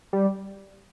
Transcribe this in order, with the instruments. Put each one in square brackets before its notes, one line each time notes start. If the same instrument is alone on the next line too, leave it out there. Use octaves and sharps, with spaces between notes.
[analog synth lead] G3